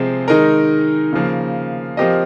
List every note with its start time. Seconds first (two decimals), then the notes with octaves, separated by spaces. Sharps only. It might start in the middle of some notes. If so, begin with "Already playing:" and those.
Already playing: C3 F3 G#3 C4
0.28 D#3 G#3 D#4 A#4
1.13 C#3 F3 A#3
1.97 F3 C4 G4 A#4 D#5